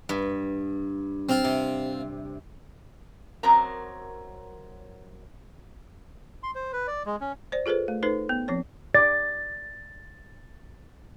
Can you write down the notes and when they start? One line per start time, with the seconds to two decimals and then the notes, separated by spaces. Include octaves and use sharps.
0.09 G2
1.29 C4 F4
1.44 C3
3.43 F#2 F#3 C4 A#4 A#5
6.43 C6
6.55 C5
6.73 B4
6.87 D5
7.06 G#3
7.21 C#4
7.52 C5 D5
7.66 F4 G#4 A4 B4 C5
7.88 A3
8.03 D#4 A4 B4 C5
8.29 B3
8.48 F3 C4 C#5
8.95 D5 A6